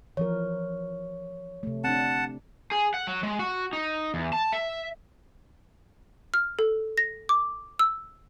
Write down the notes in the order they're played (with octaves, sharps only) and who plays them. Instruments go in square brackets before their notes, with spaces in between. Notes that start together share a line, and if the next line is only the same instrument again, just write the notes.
[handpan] E3 F3 A#4 [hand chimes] C#5
[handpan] C3 A3
[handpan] C4 D4 [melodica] F#5 A5
[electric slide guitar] G#4
F#5
F#3
G#3
F#4
D#4
E2
A5
E5
[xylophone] F6
A4
A#6
D6
E6